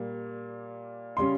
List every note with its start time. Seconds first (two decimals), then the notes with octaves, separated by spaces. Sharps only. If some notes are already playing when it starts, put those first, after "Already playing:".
Already playing: A#2 G3 A#3
1.17 C#3 G3 C#4 C6